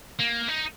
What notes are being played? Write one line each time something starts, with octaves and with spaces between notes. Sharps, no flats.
A#3
D#4